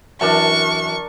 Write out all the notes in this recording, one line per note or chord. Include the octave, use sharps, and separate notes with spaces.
F#2 E3 D4 A#4 A5 C#6